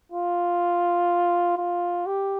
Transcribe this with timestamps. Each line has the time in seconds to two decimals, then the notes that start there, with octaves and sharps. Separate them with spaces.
0.12 F4
1.57 F4
2.06 G4